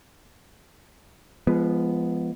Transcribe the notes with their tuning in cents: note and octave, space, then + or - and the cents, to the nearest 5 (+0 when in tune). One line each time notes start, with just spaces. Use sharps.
F3 -25 G#3 +0 B3 +0